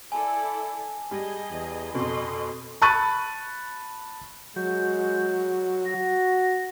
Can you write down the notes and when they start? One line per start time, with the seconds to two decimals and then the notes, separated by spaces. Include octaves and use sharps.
0.12 E4 A4 D5 G#5 A5
1.11 G3 G#4 D#5
1.51 E2
1.95 F2 B2 A4 D#5 C6
2.82 A5 B5 C#6 F#6 A6 D#7
4.56 F#3 G#3 G6
5.85 F#4 A#6